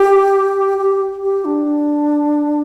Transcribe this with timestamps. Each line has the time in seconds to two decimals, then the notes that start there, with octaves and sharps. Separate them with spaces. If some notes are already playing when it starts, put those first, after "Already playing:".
Already playing: G4
0.79 G4
1.23 G4
1.45 D4